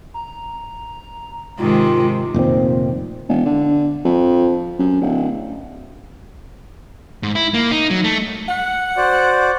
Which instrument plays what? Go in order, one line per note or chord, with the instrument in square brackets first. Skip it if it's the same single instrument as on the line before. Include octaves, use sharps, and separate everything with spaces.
[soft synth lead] A#5
[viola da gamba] G#2 C3 D#3 [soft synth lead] F4
[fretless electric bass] F1 A#2 D#3 C4
[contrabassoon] E1
D3
F2
F#2
D1
[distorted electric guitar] G#2
E4
A#3
D#4
F#3
A3
[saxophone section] F#5
[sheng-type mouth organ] F#4 C5 D5